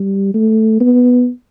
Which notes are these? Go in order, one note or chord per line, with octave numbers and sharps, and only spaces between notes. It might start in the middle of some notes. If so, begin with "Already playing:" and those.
Already playing: G3
A3
B3